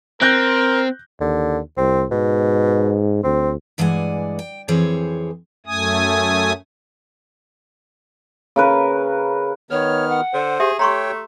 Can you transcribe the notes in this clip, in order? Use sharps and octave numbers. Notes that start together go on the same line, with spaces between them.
C4 A#4 F#6 G6 A#6
D#2 D3
C2 C4
G#2 B2
D2 C4
G2 E3 G#3 D5 F#5 G#5
G5
F2 E3 C4 G#4 C5 C#5
F#2 A3 G#5 D#6
C#3 A#4 B4
D#3 B3 C#5 F6
F#5
D3 C5
G4 G#4 E5
A3 G4 C#5 G5 A#5 C6 C#6